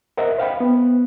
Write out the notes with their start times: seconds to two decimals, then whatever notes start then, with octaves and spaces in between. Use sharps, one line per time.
0.17 A#4 C5 D#5 E5 F#5
0.38 C5 F5 G5 B5
0.60 B3